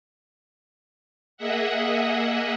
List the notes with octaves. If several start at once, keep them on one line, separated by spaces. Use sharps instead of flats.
A#3 G#4 D#5 E5 F#5